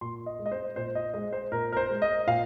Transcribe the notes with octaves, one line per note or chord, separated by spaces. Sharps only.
A#2 C6
D#5
G#3
D#5
C5
A#2 C5
D#5
G#3 D#5
C5
A#2 A#4
A#4
C5
G#3
D#5
A#2 F5